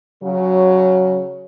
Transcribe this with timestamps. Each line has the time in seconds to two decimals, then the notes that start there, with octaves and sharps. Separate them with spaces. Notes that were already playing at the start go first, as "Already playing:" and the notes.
0.22 C#3 F#3